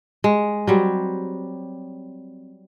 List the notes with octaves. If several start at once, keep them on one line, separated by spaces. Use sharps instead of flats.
G#3
F#3 G3 C4